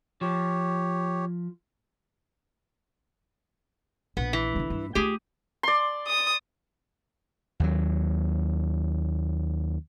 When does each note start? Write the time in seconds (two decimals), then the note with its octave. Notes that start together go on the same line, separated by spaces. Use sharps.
0.21 F3 G4 C#5
4.17 A#1 B3
4.33 E3
4.56 D3 D4
4.70 G2
4.95 A3 F4 G4 G#4
5.63 D5 C6
6.08 D#6
7.60 D#2 F#3